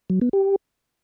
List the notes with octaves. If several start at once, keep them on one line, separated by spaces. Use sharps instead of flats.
F#3
B3
G4